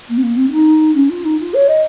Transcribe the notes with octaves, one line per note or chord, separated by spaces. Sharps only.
A#3
C4
A#3
C4
D#4
C#4
F4
D#4
F4
C#5
D#5